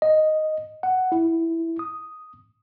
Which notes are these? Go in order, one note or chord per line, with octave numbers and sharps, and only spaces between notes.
D#5
F#5
E4
D#6